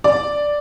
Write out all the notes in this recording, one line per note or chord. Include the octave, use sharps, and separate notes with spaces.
D5